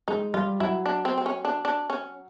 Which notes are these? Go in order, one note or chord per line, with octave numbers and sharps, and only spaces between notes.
G#3 D#4
G3 F4
F#3 E4
D4
C4
C4
C#4
D4
D4
C#4